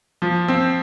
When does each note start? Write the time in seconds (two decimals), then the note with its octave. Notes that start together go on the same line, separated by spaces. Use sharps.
0.22 F3
0.48 C4